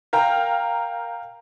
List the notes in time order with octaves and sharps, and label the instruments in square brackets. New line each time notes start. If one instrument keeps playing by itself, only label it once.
[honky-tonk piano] A#4 F5 G5 A#5